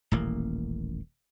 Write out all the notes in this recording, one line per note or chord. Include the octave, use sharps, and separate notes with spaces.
D#1 A1 A#3